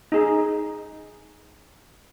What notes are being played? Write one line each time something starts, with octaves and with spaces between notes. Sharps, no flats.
D#4 G#4